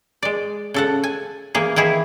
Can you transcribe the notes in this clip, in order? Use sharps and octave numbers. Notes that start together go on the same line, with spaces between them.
G#3 D5
C#3 A4 F#5
G#5
E3 A#3 G#4
D#3 E3 E4 G#4